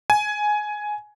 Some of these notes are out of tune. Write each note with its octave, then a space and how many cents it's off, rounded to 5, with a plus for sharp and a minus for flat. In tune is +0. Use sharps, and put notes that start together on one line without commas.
G#5 +10